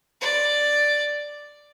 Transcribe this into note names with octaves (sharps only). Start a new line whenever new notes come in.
D5